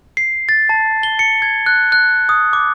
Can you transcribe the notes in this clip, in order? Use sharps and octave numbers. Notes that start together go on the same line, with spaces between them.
C7
A6
A5
G7
C#7
G#6
F#6
F#6
D#6
D6